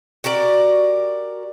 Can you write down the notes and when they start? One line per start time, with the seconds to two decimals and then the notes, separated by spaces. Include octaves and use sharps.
0.24 F#4 G4 A#4 D5